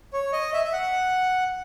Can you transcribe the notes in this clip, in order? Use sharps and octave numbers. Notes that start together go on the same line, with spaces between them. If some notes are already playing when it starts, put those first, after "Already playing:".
C#5
D#5
E5
E5
F#5